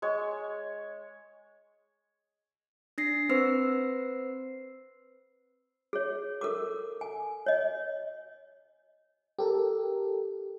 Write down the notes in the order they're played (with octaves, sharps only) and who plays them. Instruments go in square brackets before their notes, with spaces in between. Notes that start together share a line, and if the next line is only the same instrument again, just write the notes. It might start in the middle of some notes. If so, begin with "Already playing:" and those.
[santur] G#3 C#5
[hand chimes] D4 A#6 C7
C4 B4 C5 E6 C7
[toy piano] G#4 C#5
A4 A#4 D6
G#5
C#5 D#5
[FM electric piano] G4 A4 A#4